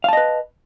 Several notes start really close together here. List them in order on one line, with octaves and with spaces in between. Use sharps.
F5 A5 D#5 B4